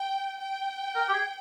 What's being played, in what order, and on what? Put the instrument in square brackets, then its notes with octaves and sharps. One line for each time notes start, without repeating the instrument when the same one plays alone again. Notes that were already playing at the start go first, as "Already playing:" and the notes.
Already playing: [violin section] G5
G5
[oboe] A#4
G4
G#4